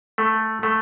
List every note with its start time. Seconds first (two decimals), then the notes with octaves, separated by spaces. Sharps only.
0.18 A3
0.63 A3